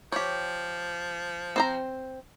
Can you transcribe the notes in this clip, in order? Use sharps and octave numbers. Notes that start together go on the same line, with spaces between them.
F3 G4 C#5
C4 C5 A#5